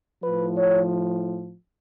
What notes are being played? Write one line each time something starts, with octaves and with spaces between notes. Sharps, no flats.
A2 F3 B4
C#5